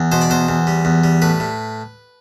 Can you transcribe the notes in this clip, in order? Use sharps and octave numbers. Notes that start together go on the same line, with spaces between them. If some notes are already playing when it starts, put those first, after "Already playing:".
Already playing: E2
B2 C5
D5
E2 C5
E2
G3
E2
G3
A2 B4
A2